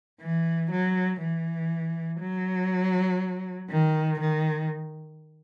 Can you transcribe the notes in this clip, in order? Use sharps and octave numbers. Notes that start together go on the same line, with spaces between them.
E3
F#3
E3
F#3
D#3
D#3